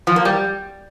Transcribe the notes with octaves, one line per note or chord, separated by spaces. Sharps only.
F3
A#3
G3